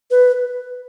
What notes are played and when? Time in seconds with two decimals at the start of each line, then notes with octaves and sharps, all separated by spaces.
0.11 B4